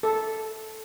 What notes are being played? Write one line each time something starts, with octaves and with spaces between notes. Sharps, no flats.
A4